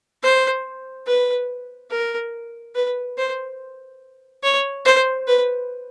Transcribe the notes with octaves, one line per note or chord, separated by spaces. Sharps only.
C5
B4
A#4
B4
C5
C#5
C5
B4